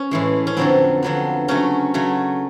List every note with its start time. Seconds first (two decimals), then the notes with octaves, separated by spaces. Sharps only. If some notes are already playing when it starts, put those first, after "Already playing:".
Already playing: C#4
0.11 A2 E3 G#3
0.47 C#4
0.57 F2 D3 F#3 B3 C4
1.03 F2 D3 F#3 B3
1.48 C#3 F#3 A3 C#4
1.94 C#3 F#3 A3